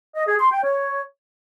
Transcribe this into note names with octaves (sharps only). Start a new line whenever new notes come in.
D#5
G#4
C6
G5
C#5